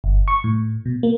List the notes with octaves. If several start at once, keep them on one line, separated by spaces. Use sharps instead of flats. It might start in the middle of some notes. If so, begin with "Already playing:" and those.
G1
C#6
A2
B2
A#3